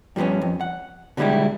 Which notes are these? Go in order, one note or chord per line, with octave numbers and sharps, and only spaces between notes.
G2 F3 G3 B3 C#4
F2
F#5
B2 D3 G3 G#3 E4 G4